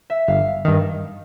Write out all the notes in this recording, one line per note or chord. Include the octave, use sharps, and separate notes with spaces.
E5
G1 F5
G2 D#3